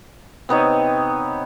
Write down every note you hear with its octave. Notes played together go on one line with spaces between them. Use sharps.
C3 B3 D#4 C#5